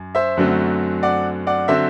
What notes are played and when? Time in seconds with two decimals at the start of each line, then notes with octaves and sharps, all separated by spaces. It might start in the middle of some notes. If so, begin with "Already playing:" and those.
Already playing: F#2
0.15 C5 E5
0.37 F#2 D3 F#3 A3 C4
1.03 D5 F#5
1.47 D5 F#5
1.68 D3 F#3 C4 C5 E5